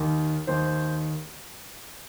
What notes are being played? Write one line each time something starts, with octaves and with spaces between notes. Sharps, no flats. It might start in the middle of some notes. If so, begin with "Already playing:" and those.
Already playing: D#2 D#3
D#2 D#3 C5